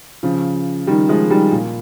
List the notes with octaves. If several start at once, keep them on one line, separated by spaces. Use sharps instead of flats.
C#3 F3
D#3 G3
F3 G#3
D#3 G3
A#2